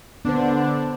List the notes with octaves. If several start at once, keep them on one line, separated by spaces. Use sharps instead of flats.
D3 B3 D4 C5